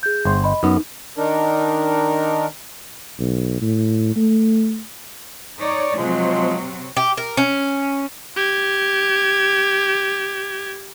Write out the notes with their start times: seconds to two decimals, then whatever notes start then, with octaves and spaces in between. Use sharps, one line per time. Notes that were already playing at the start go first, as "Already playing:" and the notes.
0.03 G#4 G6
0.25 G1 C5
0.44 D#5 B5
0.63 F#2 B3 D#4
1.18 D#3 D4 D#4 A#4
3.19 B1
3.61 A2
4.16 A3
5.60 D#4 C#5 D5
5.98 C3 F3 F#3 G#3 C4
6.97 G4
7.17 A#4
7.37 C#4
8.36 G4 G#6